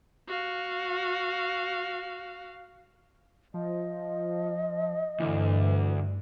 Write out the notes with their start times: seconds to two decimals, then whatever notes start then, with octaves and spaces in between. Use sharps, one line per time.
0.28 F#4 F5
3.54 F3 D#5
5.20 D2 G2 E3